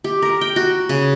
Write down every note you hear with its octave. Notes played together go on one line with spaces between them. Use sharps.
G4
A#4
G5
F#4
C#3